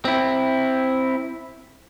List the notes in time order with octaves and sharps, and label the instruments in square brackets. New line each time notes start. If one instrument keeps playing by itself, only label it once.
[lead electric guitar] C4 E4